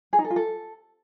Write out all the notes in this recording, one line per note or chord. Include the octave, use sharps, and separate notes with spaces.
G#4
D#4
A4
F4
A4